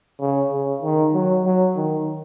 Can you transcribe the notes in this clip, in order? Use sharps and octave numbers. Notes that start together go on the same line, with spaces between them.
C#3
C#3
D#3
F#3
F#3
D#3